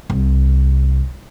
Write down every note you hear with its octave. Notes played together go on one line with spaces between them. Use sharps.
C2